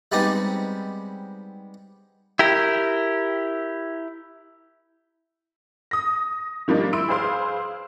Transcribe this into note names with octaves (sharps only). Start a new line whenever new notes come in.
G3 G#3 B3 C4 D#4 G4
E4 G4 A#4
D#6 A#6
D#3 F3 G3 A#3 D4 D#4
E4 B5 C6 E6 D7
G#4 B4 C5 F5 C6